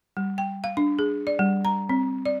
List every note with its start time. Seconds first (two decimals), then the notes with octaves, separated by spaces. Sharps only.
0.17 G3
0.38 G5
0.64 F5
0.77 D4
0.99 G#4
1.27 D5
1.39 G3
1.65 A#5
1.89 C4
2.26 D5